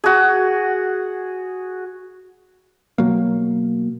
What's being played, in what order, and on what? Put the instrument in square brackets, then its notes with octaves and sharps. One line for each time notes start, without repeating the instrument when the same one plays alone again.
[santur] F#4 G#4
[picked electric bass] B2 F#3 A#3